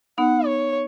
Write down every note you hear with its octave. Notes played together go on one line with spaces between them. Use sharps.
B3 D#4 F#5
C#5